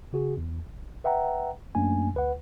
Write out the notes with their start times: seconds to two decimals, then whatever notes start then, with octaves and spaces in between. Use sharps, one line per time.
0.13 C#3 F#4 G#4
0.37 E2
0.67 A1
1.04 B4 E5 F#5 G5 A#5
1.75 F#2 A3 A#3 D4 G#5
2.14 D2 B4 F#5